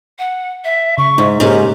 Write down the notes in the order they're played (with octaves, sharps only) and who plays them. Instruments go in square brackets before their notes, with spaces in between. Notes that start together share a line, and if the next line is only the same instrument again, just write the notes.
[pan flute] F#5
E5
[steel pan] C#3 [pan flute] C#6
[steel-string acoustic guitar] G#2 [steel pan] D#4
[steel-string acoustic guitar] G#2 [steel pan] A#3 C#4 A#4 [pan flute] G4